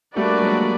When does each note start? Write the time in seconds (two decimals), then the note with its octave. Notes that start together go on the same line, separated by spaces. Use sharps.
0.16 G3 A3 A#3 D4 F#4 B4 D5
0.42 F#3 G#3